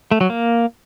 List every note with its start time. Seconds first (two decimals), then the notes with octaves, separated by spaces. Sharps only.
0.11 A3
0.21 F#3
0.30 A#3